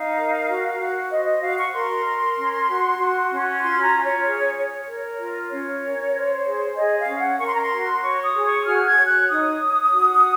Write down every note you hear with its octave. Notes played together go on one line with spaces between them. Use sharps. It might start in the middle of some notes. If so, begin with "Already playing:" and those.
Already playing: D#4 F5
A#4
F#4
F#4
C5 D#5
D#5
F#4 F5
C#6
A#4 C6
A#4
C#4
F#4
F#4
C#4
F4 C6
A#5
F4
C#5
G#4
C#5
A#4
F4
C#4 C#5
A#4
C5
G#4
G#4 D#5
F5
C#4
F#5
A#4 C#6
C6
A#5
C6
F#4
C#5 C#6
D#6
G#4
C#6
F#4 F6
G#6
C#5
F#6
D#4 D#6
C#5
F#4